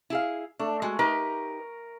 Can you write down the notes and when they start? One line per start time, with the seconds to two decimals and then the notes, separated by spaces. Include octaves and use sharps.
0.10 E4 G#4 F5
0.59 A3 D4
0.82 G#3 F#4
0.99 D#4 G4 A#4 B4